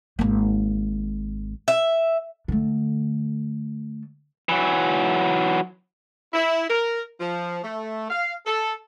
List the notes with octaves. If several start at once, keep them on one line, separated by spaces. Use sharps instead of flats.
G#1 A#3
E5
D3 A3
E3 F#3
E4
A#4
F3
A3
F5
A4